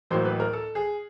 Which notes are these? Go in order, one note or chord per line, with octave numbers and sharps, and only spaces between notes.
A1 A2 F#3 A#3 C5
B4
A#4
A4
G#4